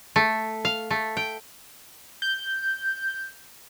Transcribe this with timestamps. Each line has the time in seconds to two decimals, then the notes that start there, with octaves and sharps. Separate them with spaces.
0.16 A3
0.65 F5
0.90 A3
1.17 G5
2.22 G6